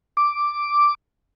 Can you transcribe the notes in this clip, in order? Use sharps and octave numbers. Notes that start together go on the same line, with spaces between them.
D6